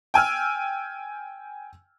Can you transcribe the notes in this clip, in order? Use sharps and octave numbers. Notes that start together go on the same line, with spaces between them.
G5 G#5 E6 F6